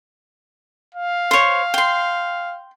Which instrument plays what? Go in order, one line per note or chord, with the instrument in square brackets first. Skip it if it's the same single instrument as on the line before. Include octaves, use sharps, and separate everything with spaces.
[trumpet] F5
[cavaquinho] C5 C#5
G5 C6